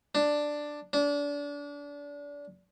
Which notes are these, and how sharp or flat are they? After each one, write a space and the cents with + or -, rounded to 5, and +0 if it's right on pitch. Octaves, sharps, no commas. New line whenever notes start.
D4 +5
D4 -30